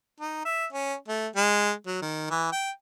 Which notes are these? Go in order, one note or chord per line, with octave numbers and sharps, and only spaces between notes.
D#4
E5
C#4
A3
G#3
F#3
D#3
E3
G5